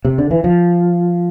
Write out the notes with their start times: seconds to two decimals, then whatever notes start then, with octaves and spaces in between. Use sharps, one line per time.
0.05 C3
0.18 D3
0.31 E3
0.44 F3